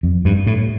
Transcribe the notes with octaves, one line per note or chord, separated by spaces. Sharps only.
F2
G2
A2